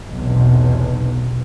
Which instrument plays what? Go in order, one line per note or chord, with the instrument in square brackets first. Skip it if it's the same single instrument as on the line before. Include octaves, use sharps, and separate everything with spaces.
[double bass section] B1 E2 C3